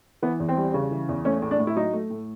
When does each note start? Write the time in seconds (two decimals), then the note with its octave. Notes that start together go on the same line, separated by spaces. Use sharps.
0.22 E3 B3
0.40 E2
0.49 C4
0.57 G3
0.74 C#3
0.91 E3
1.09 E2
1.25 A3 C#4
1.42 A2
1.51 D4
1.59 A2
1.67 E4
1.76 F#3 D#4
1.93 A3
2.10 A2